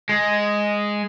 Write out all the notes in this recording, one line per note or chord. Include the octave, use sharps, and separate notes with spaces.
G#3